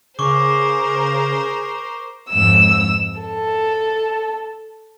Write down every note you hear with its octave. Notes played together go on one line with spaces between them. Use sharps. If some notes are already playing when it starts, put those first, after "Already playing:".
C#3 G#4 A#4 C5 C#6 D6
F2 G#2 E6
A4